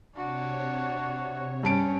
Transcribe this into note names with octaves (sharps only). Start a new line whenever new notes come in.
C3 D4 F#4 C#5
G2 C#4 A5 D7